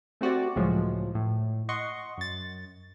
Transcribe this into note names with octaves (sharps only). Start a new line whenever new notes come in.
A3 C4 F#4 G4 D5
C#2 A2 F3 F#3 G#3
A2
D#5 F#5 C6 C#6
F#2 A6